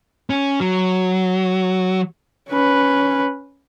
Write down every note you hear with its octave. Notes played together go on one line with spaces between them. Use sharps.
C#4
F#3
C#4 B4